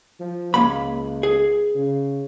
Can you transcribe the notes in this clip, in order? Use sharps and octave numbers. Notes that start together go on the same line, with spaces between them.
F3
C#2 A#3 B5
G#4
C#3